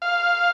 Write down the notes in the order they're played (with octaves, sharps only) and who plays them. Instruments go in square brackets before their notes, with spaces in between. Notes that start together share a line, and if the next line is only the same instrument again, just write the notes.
[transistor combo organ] F5